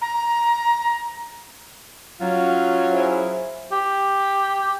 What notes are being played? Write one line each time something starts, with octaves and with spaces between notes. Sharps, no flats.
A#5
F#3 C#4 F4
E4 G#4 C5
G4